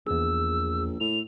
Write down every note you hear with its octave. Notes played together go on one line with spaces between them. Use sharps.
A#1 E2 G#4 E6
A2 F7